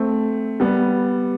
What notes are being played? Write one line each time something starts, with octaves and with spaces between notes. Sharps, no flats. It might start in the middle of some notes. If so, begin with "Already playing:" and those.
Already playing: A3 C4
G3 B3